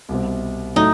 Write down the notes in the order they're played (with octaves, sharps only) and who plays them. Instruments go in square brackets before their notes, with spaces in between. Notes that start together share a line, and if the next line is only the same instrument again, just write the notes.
[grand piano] C2 B2 G3 C4
[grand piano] A2 F#3 A3 [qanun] D#4